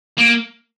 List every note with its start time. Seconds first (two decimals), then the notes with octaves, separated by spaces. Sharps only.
0.18 A#3